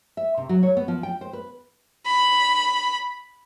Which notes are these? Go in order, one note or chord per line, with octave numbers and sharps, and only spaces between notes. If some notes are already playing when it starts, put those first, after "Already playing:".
E5
C3
F#3
C#5
B3
F3
G5
C5
B4
B5